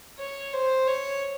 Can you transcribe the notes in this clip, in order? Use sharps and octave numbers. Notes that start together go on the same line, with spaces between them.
C#5
C5
C#5